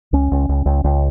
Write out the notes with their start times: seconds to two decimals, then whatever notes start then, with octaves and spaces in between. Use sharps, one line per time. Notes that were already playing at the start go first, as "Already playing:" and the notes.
0.13 C#2 C#4
0.32 C#2
0.49 C#2
0.66 C#2
0.84 C#2